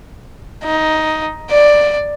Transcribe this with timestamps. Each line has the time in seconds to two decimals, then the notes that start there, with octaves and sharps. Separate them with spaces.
0.64 D#4
1.51 D5